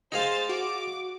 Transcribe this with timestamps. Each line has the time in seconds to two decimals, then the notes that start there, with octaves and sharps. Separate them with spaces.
0.12 D#4 G#4 C5 F5 A6
0.49 F#4 D6